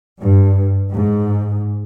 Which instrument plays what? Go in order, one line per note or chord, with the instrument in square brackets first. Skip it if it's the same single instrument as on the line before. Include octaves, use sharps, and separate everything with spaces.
[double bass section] G2
G#2